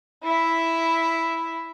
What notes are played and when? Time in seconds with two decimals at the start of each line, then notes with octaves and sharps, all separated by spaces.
0.23 E4 E5